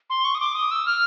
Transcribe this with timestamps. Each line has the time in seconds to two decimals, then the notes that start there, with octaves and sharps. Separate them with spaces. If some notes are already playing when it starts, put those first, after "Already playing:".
0.10 C6
0.25 C#6
0.35 D#6
0.40 D6
0.55 D#6
0.71 E6
0.86 F6